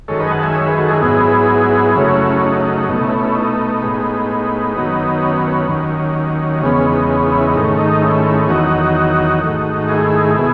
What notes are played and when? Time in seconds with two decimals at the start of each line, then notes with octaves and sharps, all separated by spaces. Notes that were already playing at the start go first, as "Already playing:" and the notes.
0.08 F#2 D#3 G#3 A4 C#5
0.20 B4 D#5
0.27 G#5
0.32 F#5 A5
0.43 E5 G#5
0.55 C#5 E5
0.67 G#4 B4
0.78 F#4 A4
0.90 E4 G#4
1.01 G#2 F#3 B3 E4 G#4
1.95 F#2 C#3 F#3 A3 C#4 E4
2.41 D#4
2.65 D#4
2.88 B2 A3 D#4
3.04 C#4 E4
3.19 C#4 E4
3.35 D#4
3.82 A2 G#3 B3
4.76 F#2 D#3 F#3 B3
5.22 C#4
5.68 D#2 D#3 F#3
6.62 E2 C#3 G#3 B3 C#4
6.85 D#4
7.09 C#4
7.21 D#4
7.32 C#4 E4
7.44 D#4
7.55 G#2 D#3 A3 C#4
7.78 D#4
8.02 C#4 E4
8.49 E2 D#3 F#3 D#4 F#4
9.42 G#2 D#3 A3
9.89 E4 G#4
10.36 B2 E4 G#4